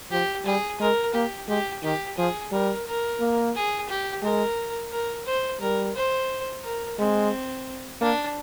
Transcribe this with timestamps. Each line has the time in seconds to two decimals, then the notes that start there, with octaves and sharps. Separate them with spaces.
0.11 F3 G4
0.45 G3 G#4
0.80 G#3 A#4
1.14 A#3 G4
1.48 G#3 G4
1.83 D#3 G4
2.17 F3 G#4
2.52 G3 A#4
2.86 A#4
3.20 A#3
3.55 G#4
3.89 G4
4.23 G#3 A#4
4.91 A#4
5.26 C5
5.60 G3 A#4
5.95 C5
6.63 A#4
6.98 G#3 C4
8.01 A#3 D4